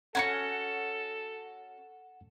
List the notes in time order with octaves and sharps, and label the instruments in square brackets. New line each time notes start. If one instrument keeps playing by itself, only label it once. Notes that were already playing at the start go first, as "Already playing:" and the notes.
[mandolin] C#4 E4 F#4 [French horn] A4 [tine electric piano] F#5 C#7